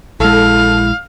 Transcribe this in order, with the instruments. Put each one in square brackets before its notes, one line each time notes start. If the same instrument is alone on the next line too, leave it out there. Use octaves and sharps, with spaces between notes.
[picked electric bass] A#1 G#3 [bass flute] E4 [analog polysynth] A4 [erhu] F5